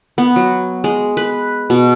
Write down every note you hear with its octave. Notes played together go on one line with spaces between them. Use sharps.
B3
F#3
G#3
B4
B2